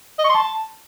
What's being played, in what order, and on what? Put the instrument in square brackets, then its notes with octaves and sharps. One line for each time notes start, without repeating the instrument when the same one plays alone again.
[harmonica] D#5
C#6
C6
A5